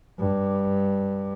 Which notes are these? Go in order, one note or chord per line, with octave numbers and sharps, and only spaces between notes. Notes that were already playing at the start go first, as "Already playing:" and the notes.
G2